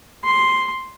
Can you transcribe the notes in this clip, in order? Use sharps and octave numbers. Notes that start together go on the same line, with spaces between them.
C6